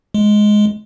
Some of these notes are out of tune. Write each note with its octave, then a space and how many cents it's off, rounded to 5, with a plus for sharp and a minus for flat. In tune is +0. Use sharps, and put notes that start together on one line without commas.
G#3 +10